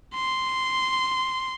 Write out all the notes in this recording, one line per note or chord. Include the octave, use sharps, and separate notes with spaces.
C6